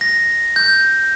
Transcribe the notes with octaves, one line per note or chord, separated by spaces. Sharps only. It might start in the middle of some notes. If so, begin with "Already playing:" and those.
A#6
G6